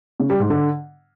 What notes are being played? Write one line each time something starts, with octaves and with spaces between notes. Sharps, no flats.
C#3
G3
G#2
D3